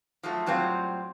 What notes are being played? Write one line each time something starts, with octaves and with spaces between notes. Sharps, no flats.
F3 F#3 A3
A2 F#3 G3 C4 F4